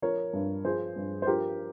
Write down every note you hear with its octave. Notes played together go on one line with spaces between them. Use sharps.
F3 A#4 C#5
G2
F3 G#4 C5
G2
C5
F3 G4 A#4